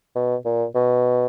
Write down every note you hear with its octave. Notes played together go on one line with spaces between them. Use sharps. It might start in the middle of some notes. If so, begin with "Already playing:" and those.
B2
A#2
B2